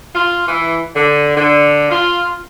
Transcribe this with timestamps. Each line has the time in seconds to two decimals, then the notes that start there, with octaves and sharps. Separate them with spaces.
0.15 F4
0.47 E3
0.96 D3
1.37 D3
1.91 F4